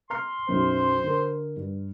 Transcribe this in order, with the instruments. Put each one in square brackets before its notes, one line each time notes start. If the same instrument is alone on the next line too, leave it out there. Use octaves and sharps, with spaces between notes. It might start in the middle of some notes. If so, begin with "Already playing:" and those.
[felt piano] A#5 F6 C7 [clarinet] C6
[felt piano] B1 F#2 [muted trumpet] C5
[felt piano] D3 A#4
G2